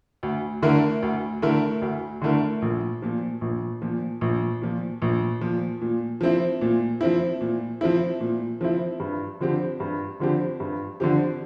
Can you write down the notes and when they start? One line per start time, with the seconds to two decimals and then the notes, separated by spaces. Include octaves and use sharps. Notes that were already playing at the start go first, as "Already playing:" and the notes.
0.23 D2
0.62 D3 A3 E4 A#4
1.03 D2
1.42 D3 A3 E4 A#4
1.82 D2
2.22 D3 A3 E4 A#4
2.62 A#1
3.02 A#2 F3
3.41 A#1
3.82 A#2 F3
4.21 A#1
4.62 A#2 F3
5.02 A#1
5.41 A#2 F3
5.82 A#2
6.21 F3 C4 E4
6.61 A#2
7.01 F3 C4 E4
7.41 A#2
7.81 F3 C4 E4
8.20 A#2
8.61 F3 C4 E4
9.00 G2
9.40 D3 F3 C4 G4
9.80 G2
10.20 D3 F3 C4 G4
10.60 G2
11.00 D3 F3 C4 G4